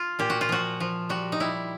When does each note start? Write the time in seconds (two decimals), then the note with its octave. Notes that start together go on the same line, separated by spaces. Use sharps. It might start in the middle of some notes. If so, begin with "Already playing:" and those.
Already playing: F4
0.19 A#2 G4
0.30 F#4
0.41 F4
0.49 F3 F#4
0.80 F3
1.09 G3 F#4
1.32 D#4
1.40 G3 E4